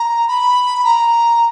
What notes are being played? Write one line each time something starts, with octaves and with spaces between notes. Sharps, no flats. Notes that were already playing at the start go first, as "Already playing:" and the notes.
Already playing: A#5
B5
A#5